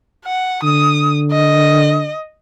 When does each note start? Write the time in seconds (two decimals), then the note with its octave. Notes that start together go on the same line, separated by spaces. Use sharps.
0.25 F#5
0.63 D3 D#6
1.32 D#5